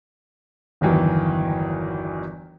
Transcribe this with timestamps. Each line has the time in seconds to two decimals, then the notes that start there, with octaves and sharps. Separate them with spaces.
0.81 G1 E2 D#3 E3 F#3